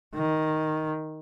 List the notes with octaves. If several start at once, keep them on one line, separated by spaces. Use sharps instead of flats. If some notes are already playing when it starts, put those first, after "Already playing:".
D#3